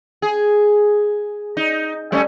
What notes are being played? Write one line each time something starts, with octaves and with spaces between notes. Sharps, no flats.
G#4
D#4
G3 A3 C#4